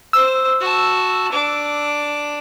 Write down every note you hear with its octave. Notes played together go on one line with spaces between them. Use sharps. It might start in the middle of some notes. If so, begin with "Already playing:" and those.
C5 E6
F#4 A5
D4 D6